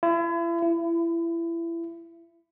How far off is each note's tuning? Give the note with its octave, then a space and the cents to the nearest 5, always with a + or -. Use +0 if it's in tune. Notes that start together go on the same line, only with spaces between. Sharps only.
E4 +40
E4 +25